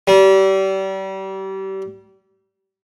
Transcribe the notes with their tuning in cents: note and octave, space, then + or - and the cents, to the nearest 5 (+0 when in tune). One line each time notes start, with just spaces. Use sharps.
G3 -30